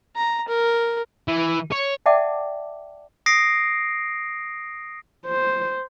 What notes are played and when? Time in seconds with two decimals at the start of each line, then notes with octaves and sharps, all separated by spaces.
0.16 A#5
0.48 A#4
1.28 E3
1.72 C#5
2.06 D5 E5 F#5 G5 A5 D6
3.26 D#6 A#6 C7 D7
5.26 C5